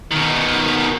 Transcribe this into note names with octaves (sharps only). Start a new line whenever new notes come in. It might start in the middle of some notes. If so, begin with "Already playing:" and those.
B2 D#3